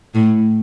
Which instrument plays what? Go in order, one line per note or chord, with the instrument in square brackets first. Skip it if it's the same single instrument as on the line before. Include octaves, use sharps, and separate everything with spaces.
[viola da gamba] A2